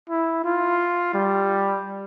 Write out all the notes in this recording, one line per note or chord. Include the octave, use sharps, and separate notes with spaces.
E4
F4
G3